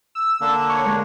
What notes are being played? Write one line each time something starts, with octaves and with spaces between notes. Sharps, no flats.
E6
D3 A#3 D4
C#5
G#3